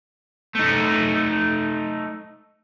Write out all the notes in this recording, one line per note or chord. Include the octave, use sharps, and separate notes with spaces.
A3 D#4